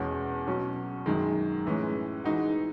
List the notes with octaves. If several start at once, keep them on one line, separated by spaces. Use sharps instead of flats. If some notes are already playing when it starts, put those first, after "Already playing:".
Already playing: E2 B2 G#3 C#4
B2 F#3 C#4
F#2 D#3 G#3
A2 E3 G#3 C#4
E3 G#3 D#4 F#4